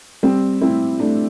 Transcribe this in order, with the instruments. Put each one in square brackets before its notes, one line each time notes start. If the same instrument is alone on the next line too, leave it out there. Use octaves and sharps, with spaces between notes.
[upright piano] G3 C4
C4 E4
A3 D4